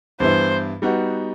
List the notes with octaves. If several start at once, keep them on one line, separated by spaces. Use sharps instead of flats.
G2 E3 B3 E4 C5
G3 B3 D#4 F#4